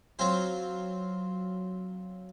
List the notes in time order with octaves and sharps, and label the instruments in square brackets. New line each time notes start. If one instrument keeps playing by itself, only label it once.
[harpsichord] F#3 C4 F4 C5